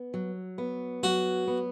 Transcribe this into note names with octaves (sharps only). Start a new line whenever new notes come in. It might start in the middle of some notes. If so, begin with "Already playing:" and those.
Already playing: B3
F#3
B3
F#3 F#4
B3